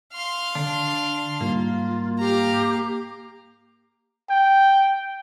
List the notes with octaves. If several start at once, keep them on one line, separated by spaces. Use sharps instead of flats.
F5 C6
D3 D4
G#2 G3 A#3 D#4 F4
G4 F5 A#5
G5